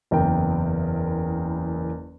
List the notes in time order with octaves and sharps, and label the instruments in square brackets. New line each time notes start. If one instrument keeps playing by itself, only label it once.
[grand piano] F#1 E2 A#4 G5